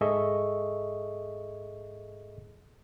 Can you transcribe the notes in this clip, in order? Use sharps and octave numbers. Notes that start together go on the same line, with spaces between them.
G#2 G#4 A4 D#5 E5 C#6